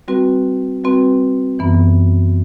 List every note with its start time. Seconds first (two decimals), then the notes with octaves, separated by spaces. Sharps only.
0.08 G3 C4 F#4 B4
0.84 G3 C4 F#4 B4
1.59 F#2 E3 B3